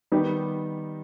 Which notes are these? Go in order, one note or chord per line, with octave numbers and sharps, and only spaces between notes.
D#3 G3 B3 D#4 G4